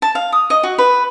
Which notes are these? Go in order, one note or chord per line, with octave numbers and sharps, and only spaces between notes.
A5
F5
D#6
D#5
F#4
B4